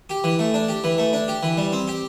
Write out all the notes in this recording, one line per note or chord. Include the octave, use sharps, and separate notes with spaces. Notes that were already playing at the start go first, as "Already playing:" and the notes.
G4
E3
A3
D4
G4
E3
A3
D4
G4
E3
G3
C4
G4